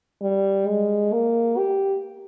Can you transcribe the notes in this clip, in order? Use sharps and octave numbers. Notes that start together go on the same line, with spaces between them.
G3
G#3
A#3
G4